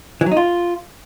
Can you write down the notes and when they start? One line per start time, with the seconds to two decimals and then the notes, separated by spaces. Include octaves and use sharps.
0.21 E3
0.26 F#3
0.31 D#4
0.37 F4